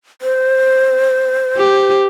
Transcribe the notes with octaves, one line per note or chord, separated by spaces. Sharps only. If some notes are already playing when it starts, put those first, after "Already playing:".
C5
G4